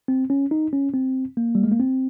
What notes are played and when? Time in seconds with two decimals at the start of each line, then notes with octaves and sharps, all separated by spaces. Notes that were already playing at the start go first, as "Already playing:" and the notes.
0.08 C4
0.30 C#4
0.51 D#4
0.73 C#4
0.94 C4
1.37 A#3
1.55 G3
1.64 G#3
1.71 A#3
1.80 C4